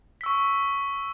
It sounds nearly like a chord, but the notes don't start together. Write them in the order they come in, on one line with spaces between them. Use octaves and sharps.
B6 E6 C#6